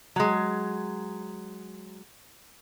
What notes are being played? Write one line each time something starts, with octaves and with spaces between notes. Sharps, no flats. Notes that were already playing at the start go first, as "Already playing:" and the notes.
F#3 G#3